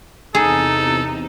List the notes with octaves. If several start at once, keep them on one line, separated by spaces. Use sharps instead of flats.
E2 C3 D#4 G#4 A4